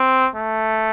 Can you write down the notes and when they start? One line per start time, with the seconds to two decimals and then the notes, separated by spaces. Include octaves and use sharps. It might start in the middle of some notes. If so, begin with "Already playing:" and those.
Already playing: C4
0.36 A3